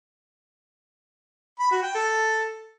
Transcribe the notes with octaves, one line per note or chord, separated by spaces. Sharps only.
B5
F#4
G5
A4